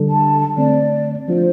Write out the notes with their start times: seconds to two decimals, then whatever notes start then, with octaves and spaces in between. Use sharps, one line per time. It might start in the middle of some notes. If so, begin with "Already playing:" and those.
Already playing: D3 G3 D4 A4
0.09 A5
0.57 D3 A3 C4 D5
1.28 F3 A3 D4 F4 C5